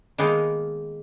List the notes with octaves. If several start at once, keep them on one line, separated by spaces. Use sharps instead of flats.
D#3 G#3 A#3 B3 D#4